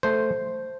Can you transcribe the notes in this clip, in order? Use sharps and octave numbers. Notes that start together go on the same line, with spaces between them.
A3 C5